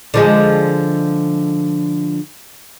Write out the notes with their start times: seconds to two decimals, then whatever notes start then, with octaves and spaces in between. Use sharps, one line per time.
0.14 D3 F3 G#3